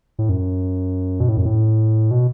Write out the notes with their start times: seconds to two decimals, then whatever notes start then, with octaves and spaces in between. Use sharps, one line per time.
0.19 A2
0.29 F#2
1.20 B2
1.29 A2
1.37 F#2
1.45 A2
2.11 B2